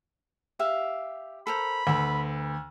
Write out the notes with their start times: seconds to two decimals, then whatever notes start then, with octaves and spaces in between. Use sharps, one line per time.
0.59 G4 E5 F5
1.47 A4 A#4 C5 B5
1.87 D2 A4 B4